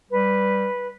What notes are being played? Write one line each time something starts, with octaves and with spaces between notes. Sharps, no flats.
G3 B4